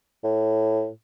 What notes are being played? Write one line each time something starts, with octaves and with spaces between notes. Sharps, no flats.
A2